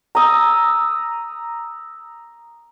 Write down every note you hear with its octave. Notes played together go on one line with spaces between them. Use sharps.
A#5 D#6 E6